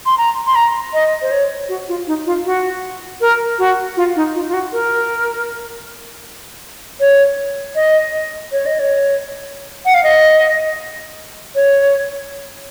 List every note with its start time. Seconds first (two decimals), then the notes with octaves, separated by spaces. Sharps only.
0.06 C6
0.18 A#5
0.47 C6
0.55 A#5
0.93 D#5
1.22 C5
1.31 C#5
1.69 F#4
1.88 F4
2.07 D#4
2.26 F4
2.45 F#4
3.21 A#4
3.59 F#4
3.97 F4
4.16 D#4
4.35 F4
4.48 F4
4.54 F#4
4.73 A#4
7.00 C#5
7.75 D#5
8.52 C#5
8.66 D#5
8.80 C#5
9.85 F#5
9.94 F5
10.03 D#5
11.55 C#5